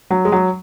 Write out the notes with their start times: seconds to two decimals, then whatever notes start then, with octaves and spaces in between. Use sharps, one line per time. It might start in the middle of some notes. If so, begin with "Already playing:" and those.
0.11 F#3
0.25 G#3
0.32 F#3